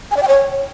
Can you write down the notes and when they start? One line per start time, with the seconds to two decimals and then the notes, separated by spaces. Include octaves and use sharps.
0.11 G#5
0.17 D5
0.22 G5
0.28 C#5